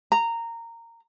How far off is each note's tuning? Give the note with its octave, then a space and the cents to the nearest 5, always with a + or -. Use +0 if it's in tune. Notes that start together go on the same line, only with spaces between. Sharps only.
A#5 -15